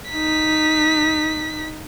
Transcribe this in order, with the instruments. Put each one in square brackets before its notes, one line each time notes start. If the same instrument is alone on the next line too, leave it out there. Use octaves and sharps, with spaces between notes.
[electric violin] D#4 B6